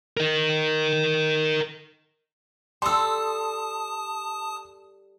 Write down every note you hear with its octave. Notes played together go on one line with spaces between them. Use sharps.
A#4 D#5
G3 A4 A5 C6 D#6 E6